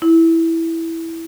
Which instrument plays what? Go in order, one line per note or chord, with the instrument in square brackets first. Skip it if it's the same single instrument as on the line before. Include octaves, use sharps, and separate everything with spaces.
[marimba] E4